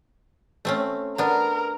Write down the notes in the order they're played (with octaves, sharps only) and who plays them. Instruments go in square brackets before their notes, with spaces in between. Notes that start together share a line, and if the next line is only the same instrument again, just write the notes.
[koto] A3 C4 C#4
[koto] B3 D4 [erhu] A#4